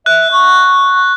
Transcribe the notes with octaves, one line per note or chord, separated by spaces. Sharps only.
E5 F#6
C#6